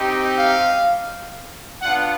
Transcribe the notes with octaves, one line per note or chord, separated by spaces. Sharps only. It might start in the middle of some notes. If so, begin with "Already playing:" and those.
Already playing: C4 D#4 G4
F5
B3 D4 F4 F#5